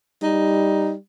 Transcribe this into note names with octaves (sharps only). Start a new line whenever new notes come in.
G3 D#4